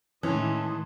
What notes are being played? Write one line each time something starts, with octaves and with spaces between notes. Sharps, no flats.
A2 D#3 E3 G#3 C#4 A5 C6 D#6